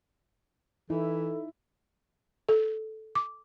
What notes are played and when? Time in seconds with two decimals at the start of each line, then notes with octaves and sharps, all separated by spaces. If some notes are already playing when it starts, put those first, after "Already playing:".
0.90 E3 D#4 E4 A4
2.49 A4
3.15 D6